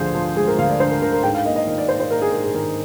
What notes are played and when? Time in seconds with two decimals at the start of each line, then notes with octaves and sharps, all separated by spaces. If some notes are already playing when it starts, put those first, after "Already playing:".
Already playing: D2 D3 F3 G#4 C5
0.15 F3
0.36 G#3 G#4
0.48 A#4
0.58 D2 F5
0.69 D5
0.80 D3 C5
0.91 A#4
1.02 D3 A#4
1.13 A#4
1.23 G#2 G5
1.34 F5
1.45 A#3 D#5
1.56 D#5
1.67 D#3 D#5
1.78 D5
1.88 A#3 C5
2.00 C5
2.11 A#3 A#4
2.22 G#4
2.32 G#2 A#4
2.43 G#4
2.54 D#3 A#4